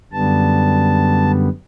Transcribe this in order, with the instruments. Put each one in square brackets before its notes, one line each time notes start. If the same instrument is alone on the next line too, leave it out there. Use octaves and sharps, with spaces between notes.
[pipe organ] F#2 D3 G3 B3 A5